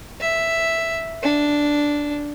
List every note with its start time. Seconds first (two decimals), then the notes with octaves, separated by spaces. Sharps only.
0.21 E5
1.23 D4